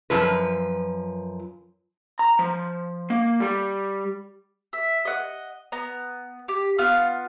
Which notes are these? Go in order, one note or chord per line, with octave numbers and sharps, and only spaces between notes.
F#2 F3 B4
A#5
F3
A#3
G3
E5
D#5 F#5
B3 A#5
G4
B3 F4 F6